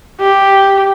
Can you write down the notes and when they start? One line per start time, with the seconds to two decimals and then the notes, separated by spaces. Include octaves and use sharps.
0.20 G4